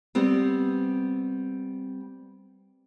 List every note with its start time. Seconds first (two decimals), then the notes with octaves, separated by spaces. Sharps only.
0.15 G3 B3 C4